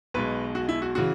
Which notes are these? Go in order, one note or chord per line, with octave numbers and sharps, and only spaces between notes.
B1 B2 G#3 B4
F#4
E4
F#4
C#3 E3 F#4